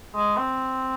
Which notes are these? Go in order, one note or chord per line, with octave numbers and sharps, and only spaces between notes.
G#3
C4